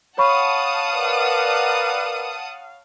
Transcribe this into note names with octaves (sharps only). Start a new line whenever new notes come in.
C#5 F5 F#5 A5 B5 C#6 D#6
A#4 B4 D5